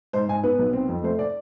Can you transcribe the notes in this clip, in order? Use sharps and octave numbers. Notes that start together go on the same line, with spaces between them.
G#2 C5
G#2 G#5
B3 B4
B1
C4
F2
A3 C5
D5